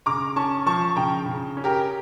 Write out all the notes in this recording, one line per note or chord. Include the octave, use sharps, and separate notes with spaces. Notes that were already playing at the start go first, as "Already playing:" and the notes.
C#3 A#5 D6
C#4 A5 C#6
F3 A5 C#6
C#3 G5 A#5
C#3
C#4
G4 A#4